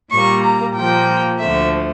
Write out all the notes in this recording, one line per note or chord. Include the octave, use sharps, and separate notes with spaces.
A#2 G3 A#3 C#6
A#5
A#2 F3 A#3 G5
D2 D3 F3 A3 E5